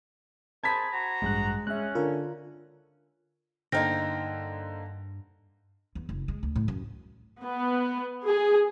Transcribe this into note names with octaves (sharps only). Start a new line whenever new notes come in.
G#4 A#4 C5 A5 B5 G#6 A6 B6
F#4 C5 A#5
A1 G2 G#3 F#6
G#3 C#4 E5 F#6
D3 F4 A#4
G2 D3 A#3 D#4 C5 G5 F6 A#6
E2
F#1
G#3
D2
A2
F#2
B3
G#4